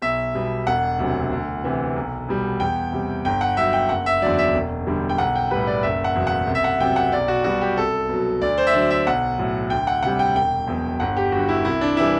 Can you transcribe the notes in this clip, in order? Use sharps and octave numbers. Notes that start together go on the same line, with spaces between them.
B1 E5
B2 G3
E1 F#5
D2 C3 F#3
D2
C3 E3
B1
B2 G3
E2 G5
C3 G3
G1 G5
F#5
G2 F#3 E5
G5
F#1 F#5
E5
E2 D3 F#3 D5
E5
E1
E2 D3 G3
G5
B1 F#5
G5
A2 G3 B4
D5
F#1 E5
F#5
E2 B2 F#3
F#5
C2
E5
F#5
C3 F#3 G5
F#5
B1 D5
F#4
B2 G3 F#4
G4
C2 A4
B2 F#3
D2 D5
C5
E5
D3 F#3 D5
E5
B1 F#5
A2 F#3
D2 G5
F#5
C3 G3 F#5
G5
E1 G5
E2 B2 F#3
G1 F#5
G4
G2 D3 F#4
E4
C2 E4
D4
C3 E3 G3 E4